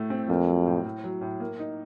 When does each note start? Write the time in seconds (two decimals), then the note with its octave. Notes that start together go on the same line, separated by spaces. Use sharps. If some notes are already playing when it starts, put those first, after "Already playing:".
Already playing: A2 A3
0.10 C4
0.29 F2 A#3
0.47 F#3
0.66 A2
0.85 A2
1.04 F#3
1.21 A2
1.40 A#3
1.59 D#4